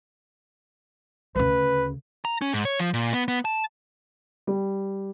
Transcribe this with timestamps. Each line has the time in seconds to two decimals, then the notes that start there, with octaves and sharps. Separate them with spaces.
1.36 D2 C#3 B4
2.25 A#5
2.42 C#4
2.54 G#2
2.65 C#5
2.80 F3
2.94 A#2
3.13 B3
3.28 B3
3.45 A5
4.47 G3